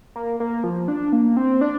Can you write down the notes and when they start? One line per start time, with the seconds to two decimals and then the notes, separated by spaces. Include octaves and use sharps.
0.16 A#3
0.40 A#3
0.64 F3
0.88 D4
1.13 A#3
1.37 C4
1.61 D4